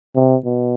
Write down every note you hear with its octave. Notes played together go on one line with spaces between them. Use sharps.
C3
B2